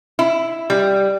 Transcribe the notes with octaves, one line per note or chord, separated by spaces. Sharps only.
E4
G3